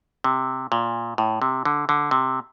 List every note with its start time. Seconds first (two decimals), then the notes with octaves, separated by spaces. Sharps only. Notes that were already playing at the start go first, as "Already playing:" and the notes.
0.24 C3
0.72 A#2
1.18 A2
1.42 C3
1.65 D3
1.89 D3
2.11 C3